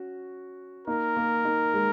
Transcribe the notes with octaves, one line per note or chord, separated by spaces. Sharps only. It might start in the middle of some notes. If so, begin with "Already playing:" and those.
Already playing: C#4 F#4
A#3 D#4 A#4
A#3
A#3 D#4
G#3